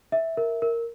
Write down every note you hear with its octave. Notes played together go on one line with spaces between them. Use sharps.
E5
A#4
A#4